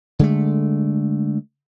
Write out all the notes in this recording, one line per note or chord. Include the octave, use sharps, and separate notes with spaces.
D3 G#3 A3